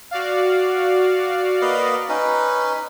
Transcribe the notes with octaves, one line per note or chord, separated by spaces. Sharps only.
F#4 D5 F5
A#3 B4 D#5
C#4 D#4 B4